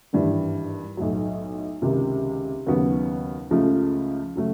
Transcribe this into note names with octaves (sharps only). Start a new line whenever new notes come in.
G#1 G2 E3
B1 A2 F#3
C#2 C3 D#3
D#2 C#3 F#3 B3
C#2 C#3 F3 A3
C#3 F#3 A3